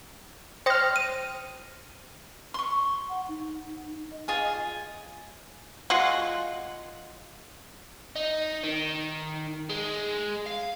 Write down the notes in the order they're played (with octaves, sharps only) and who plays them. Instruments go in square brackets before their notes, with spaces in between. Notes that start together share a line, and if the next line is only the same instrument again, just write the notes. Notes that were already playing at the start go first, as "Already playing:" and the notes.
[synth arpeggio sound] C5 F6 [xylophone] G5 D#6 A#6
[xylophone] D#7
[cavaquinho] C6 C#6
[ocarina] F#5
D#4
D#5
[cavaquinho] F4 G#4 G#5
[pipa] G#3 F4 F#4 F#5
[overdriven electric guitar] D#4
D#3
G#3
F5